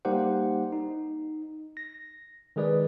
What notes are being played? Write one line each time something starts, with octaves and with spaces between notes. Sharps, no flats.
G3 A#3 D#4 G4 C5 F#5
D#4
A#6
D#3 G#3 G#4 B4 D5